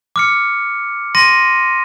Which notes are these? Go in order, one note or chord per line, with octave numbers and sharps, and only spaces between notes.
D6 F6 C#7
C6 A#6 D#7